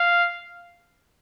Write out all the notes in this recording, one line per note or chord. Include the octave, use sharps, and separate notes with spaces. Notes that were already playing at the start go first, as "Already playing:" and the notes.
Already playing: F5